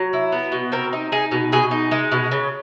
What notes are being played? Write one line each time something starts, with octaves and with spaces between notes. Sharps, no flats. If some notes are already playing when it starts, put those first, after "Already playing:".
Already playing: F#3
E4
B3
B2
C4 A#4
D#4
D#4 G#4
B2
B2 G#4
D#4
G#3
B2
C#3